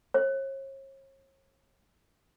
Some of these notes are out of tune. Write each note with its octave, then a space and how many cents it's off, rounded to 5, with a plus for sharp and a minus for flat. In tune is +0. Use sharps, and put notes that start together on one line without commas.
C#5 -40